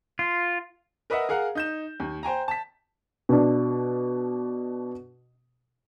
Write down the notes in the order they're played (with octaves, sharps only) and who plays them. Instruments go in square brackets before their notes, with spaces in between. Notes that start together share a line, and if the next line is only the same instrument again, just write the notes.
[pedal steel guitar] F4
[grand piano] A#4 B4 D#5 E5 F#5
G#4 A#4 F5 F#5 A#5
D#4 G6 E7
D#2
C5 G5 G#5 A#5
A5 B6
[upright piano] B2 D4